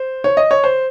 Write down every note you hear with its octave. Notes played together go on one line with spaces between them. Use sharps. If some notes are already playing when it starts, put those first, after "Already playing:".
Already playing: C5
C#5
D#5
C#5
C5